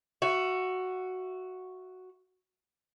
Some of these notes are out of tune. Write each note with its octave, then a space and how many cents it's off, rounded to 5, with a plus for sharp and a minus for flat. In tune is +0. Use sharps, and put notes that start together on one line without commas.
F#4 +0 E5 +25